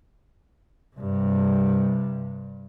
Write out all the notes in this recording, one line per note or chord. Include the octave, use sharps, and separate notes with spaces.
G2 C3